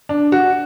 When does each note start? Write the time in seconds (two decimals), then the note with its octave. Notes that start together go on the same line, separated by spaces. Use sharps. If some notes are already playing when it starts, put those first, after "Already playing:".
0.09 D4
0.32 F#4